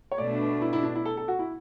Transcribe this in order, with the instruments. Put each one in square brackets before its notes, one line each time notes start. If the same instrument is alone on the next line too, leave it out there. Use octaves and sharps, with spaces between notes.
[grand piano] C#5
[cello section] B2 A3 D4 [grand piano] D5
[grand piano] E4
E4
D4
E4
A4
A4
F#4
E4